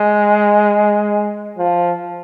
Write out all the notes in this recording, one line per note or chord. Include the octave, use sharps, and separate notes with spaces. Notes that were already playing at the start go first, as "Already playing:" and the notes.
Already playing: G#3
F3